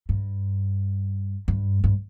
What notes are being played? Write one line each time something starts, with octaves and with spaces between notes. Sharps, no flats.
G2
G2
G2